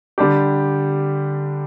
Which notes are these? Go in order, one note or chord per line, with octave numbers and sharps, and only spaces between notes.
D3 G3 D4 G4